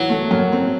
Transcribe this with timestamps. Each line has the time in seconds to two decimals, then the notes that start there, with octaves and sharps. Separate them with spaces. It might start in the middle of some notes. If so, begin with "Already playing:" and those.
Already playing: E3 F#3
0.09 A3
0.31 F#2
0.52 C4